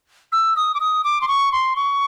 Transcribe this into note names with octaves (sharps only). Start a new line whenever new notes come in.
E6
D#6
D6
D#6
D6
C6
C#6
C6
C#6